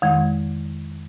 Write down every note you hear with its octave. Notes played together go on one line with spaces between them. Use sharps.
F2 D#3 G#3